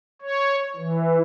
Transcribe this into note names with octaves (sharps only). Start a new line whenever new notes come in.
C#5
E3